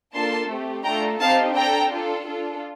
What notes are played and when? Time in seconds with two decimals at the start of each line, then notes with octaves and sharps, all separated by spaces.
0.14 A#3 D4 F4 A4 A5 C6
0.49 A3 C4 G4
0.84 A3 D4 F4 A4 G5 A#5
1.20 C4 D#4 G4 F5 A5
1.55 D4 A4 G5 A#5
1.90 D4 F4 A4
2.26 D4 F4 A4